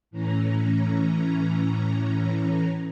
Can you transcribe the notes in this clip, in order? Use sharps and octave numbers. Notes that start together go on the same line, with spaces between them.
A2 E3 C#4 A#5